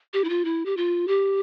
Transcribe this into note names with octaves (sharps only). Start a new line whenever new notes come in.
G4
E4
F4
E4
G4
F4
G4